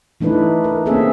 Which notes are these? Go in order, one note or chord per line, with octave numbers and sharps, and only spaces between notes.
E3 A3 D4 D#4 B4
A#4
A#3 C4 C#4 G#4 A4 E5